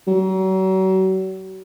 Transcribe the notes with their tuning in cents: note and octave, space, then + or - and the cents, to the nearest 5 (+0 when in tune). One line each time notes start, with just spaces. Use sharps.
F#3 +40